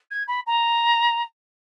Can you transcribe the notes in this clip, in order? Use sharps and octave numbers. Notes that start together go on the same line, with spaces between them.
G#6
B5
A#5